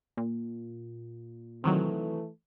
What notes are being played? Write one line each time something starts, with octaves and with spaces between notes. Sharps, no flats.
A#2
C3 D#3 E3 F#3 A3